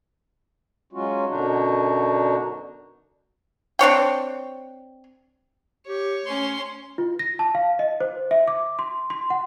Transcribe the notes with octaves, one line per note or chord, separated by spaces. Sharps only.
F#3 G#3 C#4 F4 F#4
F#2 B2 D3 D4 D#4 F#4
C4 D4 C#5 G5
G4 C#5
A3 C#4 C6
F4
A#6
A5
F5
D#5
C5
E5
D6
C6
C6
F#5